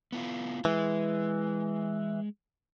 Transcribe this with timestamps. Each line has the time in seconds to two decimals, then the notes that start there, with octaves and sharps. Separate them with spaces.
0.12 B3 E4 F4
0.65 E3 G#3